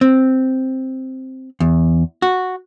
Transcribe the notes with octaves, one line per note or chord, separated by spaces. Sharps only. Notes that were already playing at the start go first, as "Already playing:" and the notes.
C4
E2
F#4